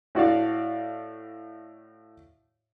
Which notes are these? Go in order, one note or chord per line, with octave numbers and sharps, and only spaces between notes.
A2 F#4 D5 F5